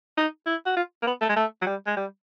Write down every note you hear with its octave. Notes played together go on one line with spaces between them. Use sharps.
D#4
E4
F#4
F4
A#3
B3
A3
G#3
A3
F#3
G3
G#3
G3